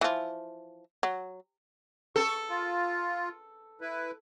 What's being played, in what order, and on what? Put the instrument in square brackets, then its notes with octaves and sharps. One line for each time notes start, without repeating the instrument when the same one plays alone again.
[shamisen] E3 F3
F#3
[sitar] A4 [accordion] C#6
[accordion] F4
E4 B4